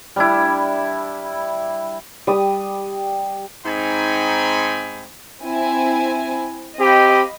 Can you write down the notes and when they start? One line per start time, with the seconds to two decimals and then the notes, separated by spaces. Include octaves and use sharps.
0.16 G3 D4 E4
2.27 G3 D#6
3.66 G#2 C4 D#4 G5 G#5 B5
5.43 C4 E4 G#5
6.78 C4 G4 D#5 F5 B5